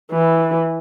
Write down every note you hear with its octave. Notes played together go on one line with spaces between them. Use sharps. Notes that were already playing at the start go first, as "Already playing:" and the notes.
E3